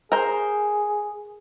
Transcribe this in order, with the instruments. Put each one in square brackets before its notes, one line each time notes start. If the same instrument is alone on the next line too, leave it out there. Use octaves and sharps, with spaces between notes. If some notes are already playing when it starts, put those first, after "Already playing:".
[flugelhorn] G#4 [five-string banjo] A#4 C5